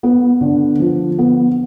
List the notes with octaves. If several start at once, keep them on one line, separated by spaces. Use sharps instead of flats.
B3
D3
F3
B3